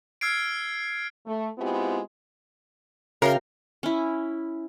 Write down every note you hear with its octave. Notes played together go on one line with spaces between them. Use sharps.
E6 F6 G#6 C7 D7
A3
G#3 B3 C4 E4 F4 G4
C#3 F#4 A#4 C#5 E5 F5 G5
C#4 E4